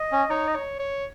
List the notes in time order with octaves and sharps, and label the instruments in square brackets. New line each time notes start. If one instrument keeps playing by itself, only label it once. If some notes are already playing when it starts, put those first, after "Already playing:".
Already playing: [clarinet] D#5
[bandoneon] C#4
[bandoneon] D#4 [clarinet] C#5
[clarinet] D#5
C#5
C#5